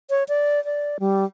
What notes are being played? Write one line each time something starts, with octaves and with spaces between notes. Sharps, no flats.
C#5
D5
D5
G3